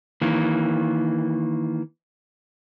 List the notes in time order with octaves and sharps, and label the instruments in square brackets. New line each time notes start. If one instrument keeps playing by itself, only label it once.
[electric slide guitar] D#3 E3 A#3